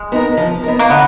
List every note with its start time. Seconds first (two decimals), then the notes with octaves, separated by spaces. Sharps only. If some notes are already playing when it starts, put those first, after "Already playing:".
Already playing: G#3
0.12 B3 D#4 A#4
0.37 F3
0.64 B3 D#4 A#4
0.79 A#3
0.90 D3 B3